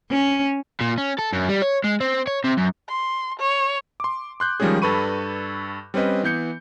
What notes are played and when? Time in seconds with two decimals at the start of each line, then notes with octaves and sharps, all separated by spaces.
0.11 C#4
0.81 A#2
0.98 C#4
1.18 A4
1.33 F#2
1.49 G3
1.62 C#5
1.84 G#3
2.01 C4
2.27 C#5
2.44 C3
2.58 F#2
2.89 C6
3.39 C#5
4.00 C6 D6
4.40 C6 F#6 G6
4.60 D#3 F3 G3 G#3 C#4 G#4
4.82 G2 A4 B4 B5 C#6 D#7
5.94 G3 C4 C#4 B4 D#5
6.23 E3 B3 G6 C#7